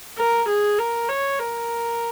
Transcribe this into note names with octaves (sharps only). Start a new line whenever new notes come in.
A#4
G#4
A#4
C#5
A#4